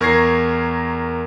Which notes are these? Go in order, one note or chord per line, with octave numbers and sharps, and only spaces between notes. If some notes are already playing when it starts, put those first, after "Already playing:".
E2 A#4 C#6 G#6 A#6 C7